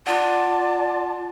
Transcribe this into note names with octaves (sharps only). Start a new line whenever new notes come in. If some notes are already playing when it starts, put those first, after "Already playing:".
F4 D5 F#5 A5